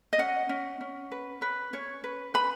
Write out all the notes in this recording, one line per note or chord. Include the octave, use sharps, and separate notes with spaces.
D#5
C#4 F#5
C#4
C#4
B4
C#4 B4
C#4 C#5
B4
B4 B5